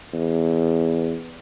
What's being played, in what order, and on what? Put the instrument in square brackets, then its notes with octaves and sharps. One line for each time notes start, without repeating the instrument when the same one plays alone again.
[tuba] E2